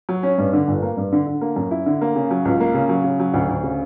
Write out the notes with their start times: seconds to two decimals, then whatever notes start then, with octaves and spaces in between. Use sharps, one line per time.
0.09 F#3
0.23 C#4
0.38 G2
0.53 D3
0.68 G1
0.82 A#3
0.97 G2
1.12 D3
1.27 D3
1.41 A#3
1.56 F#2
1.71 E4
1.86 D3
2.01 A#3
2.16 C#3
2.31 F#3
2.45 C#2
2.60 A#3
2.74 C#3
2.89 F#3
3.04 C#3
3.20 F#3
3.34 D2
3.49 D2
3.63 C#3